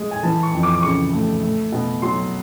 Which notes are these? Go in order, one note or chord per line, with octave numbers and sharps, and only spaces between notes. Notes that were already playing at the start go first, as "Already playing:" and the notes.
Already playing: G#3
G#5
E3 A5
C#6
F2
D6
D6
C#3 C#6
A3
A3
B2
F#3 C6